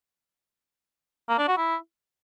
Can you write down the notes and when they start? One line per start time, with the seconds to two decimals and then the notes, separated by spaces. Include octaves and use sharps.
1.29 A#3
1.38 D4
1.48 F#4
1.57 E4